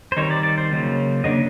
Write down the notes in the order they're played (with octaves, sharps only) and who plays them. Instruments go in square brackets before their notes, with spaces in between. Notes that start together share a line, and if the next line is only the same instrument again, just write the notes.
[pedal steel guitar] C5
D#3 G3 C4 D#4 C#5
D5
D5
C5
C#3 F#3 A#3
C#3 F#3 A#3 D4 D#5